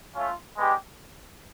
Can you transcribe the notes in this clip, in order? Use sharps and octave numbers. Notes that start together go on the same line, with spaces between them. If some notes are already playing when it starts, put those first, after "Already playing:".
A3 C#4 F4
G#3 B3 D4 G4